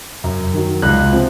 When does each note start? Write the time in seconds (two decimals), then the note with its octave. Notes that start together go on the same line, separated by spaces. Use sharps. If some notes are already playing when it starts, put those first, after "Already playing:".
0.24 F#2
0.54 D#3 F#3
0.82 C#2 F#6
1.13 C3 F3